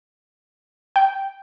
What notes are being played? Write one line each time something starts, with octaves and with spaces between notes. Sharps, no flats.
G5